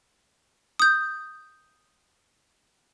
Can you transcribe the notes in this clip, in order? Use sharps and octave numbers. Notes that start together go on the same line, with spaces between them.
D#6 G6